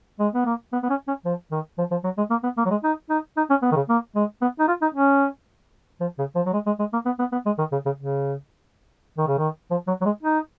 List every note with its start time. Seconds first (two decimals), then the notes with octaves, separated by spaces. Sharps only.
0.20 G#3
0.35 B3
0.46 A#3
0.73 B3
0.83 B3
0.90 C#4
1.08 C#4
1.25 F3
1.52 D#3
1.78 F3
1.91 F3
2.04 F#3
2.18 G#3
2.30 A#3
2.44 B3
2.57 A#3
2.66 F#3
2.71 G#3
2.84 D#4
3.10 D#4
3.37 D#4
3.50 C#4
3.63 B3
3.72 D#3
3.76 C#3
3.89 A#3
4.16 G#3
4.42 B3
4.60 D#4
4.68 F4
4.82 D#4
4.94 C#4
6.01 F3
6.19 C#3
6.35 F3
6.46 F#3
6.53 G#3
6.66 G#3
6.79 G#3
6.93 A#3
7.06 B3
7.19 B3
7.32 B3
7.46 G#3
7.59 D#3
7.72 C#3
7.86 C#3
7.98 C#3
9.18 D#3
9.28 C#3
9.38 D#3
9.71 F3
9.87 F#3
10.01 F#3
10.05 G#3
10.23 D#4